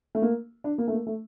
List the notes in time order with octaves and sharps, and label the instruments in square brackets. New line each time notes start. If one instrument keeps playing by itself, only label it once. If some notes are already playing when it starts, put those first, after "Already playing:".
[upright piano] A3
A#3
D4
A#3
A3
A#3
A3